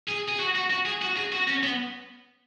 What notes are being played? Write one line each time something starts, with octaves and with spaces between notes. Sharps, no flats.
G#4
G#4
F#4
F#4
F#4
G#4
F#4
G#4
F#4
C#4
B3